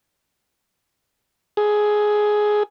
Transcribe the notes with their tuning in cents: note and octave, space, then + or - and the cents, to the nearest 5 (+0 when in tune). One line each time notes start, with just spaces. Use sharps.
G#4 +10